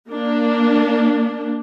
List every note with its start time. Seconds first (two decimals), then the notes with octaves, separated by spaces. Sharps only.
0.10 A#3 D4